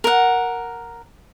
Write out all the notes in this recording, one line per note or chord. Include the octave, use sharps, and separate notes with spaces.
A#4 F#5